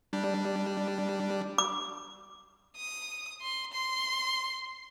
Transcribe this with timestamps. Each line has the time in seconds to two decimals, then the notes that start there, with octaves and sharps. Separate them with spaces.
0.13 G3 D4
1.58 D6
2.76 D#6
3.42 C6
3.73 C6